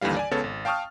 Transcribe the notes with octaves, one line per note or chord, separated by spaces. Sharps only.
A1 D#2 D3 E3 G3 F5
D5 G#5
C#2 C#3 B3 A4 C#5 A6
G#1
F5 G5 A5 C#6 D#6 F6